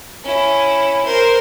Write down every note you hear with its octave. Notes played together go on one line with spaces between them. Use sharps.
C#4 E4
A#4 C5